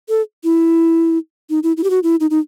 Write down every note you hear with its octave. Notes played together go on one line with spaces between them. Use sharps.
A4
E4
D#4
E4
E4
G4
F#4
E4
D#4
D#4